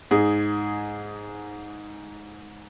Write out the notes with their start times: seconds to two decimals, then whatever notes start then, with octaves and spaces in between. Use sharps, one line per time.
0.11 G#2 G#4